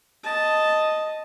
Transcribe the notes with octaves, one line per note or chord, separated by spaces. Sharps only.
D#5 A5